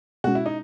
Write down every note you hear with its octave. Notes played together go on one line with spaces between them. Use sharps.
B2 G#3 C#4 F#4
E4
D#4